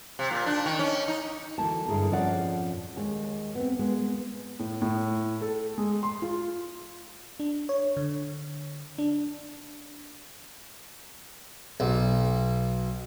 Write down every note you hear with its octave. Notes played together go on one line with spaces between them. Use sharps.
C3
A#2
D4
D#3
C#4
D#4
D2 E3 A#3 A5
G2 D3 E4 G#4 A#4
F2 A#2 F3 C#4 D5 F#5
D#2 G#3
B3 C4
G#3 A#3 B3
A2
A2
A4
G#3
C6
F4
D4
C#5
D3
D4
B1